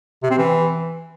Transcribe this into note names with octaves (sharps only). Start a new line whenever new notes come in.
C3
C4
E3